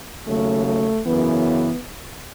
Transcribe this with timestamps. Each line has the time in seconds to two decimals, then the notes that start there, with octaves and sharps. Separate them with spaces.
0.26 D#2 C#3 F#3 A3
0.65 A3
1.06 F#2 C#3 E3 B3